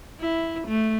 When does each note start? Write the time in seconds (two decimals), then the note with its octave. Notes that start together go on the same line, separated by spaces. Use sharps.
0.21 E4
0.67 A3